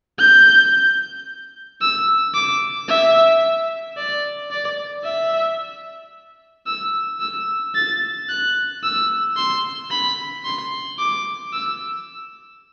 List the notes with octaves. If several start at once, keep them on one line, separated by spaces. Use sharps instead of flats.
G6
E6
D6
E5
D5
D5
E5
E6
E6
A6
F#6
E6
C6
B5
C6
D6
E6